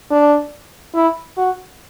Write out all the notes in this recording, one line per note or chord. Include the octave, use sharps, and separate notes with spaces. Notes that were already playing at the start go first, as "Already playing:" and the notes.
D4
E4
F#4